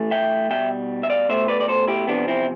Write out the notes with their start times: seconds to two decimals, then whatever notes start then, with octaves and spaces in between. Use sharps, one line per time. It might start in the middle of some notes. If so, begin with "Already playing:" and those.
Already playing: A2 E3 A3
0.11 E5 G5
0.50 B2 G3 E5 G5
1.03 E5
1.10 D5 F5
1.29 B2 A3 C5 E5
1.48 B4 D5
1.60 D5
1.68 A4 C5
1.88 E4 G4
2.07 E2 C3 F3 B3 D4
2.28 C4 E4